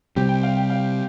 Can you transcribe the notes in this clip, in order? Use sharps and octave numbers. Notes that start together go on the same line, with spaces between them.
C3 G3 C4 G4
G5
F5
G5
F5